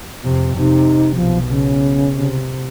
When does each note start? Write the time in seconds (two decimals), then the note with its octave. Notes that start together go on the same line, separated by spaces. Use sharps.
0.23 F2 C3
0.57 C3 D#4
1.15 B1 B2 F3
1.49 C#3
2.15 C3